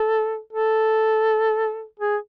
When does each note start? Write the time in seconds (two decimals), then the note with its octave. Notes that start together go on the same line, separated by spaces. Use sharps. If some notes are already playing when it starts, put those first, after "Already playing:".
Already playing: A4
0.53 A4
2.00 G#4